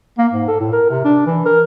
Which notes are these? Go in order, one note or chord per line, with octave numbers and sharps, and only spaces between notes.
A#3
G#2
A4
A2
A#4
C3
D4
E3
A#4